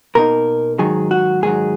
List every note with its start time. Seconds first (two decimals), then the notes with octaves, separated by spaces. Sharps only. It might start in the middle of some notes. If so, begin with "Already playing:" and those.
0.15 B2 A#3 D#4 A#4
0.79 G#2 D#3 F#3 G#4
1.11 F#4
1.42 G#2 D#3 F#3 G#4